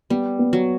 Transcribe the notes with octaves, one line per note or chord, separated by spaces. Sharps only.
G3 B3
B3
F#3